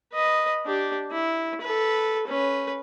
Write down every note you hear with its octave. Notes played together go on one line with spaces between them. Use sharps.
B4 D#5
D4 G4
E4
A4 B4
C#4 B4